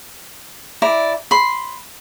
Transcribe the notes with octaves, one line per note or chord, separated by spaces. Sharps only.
E4 D5 A#5
B5 C6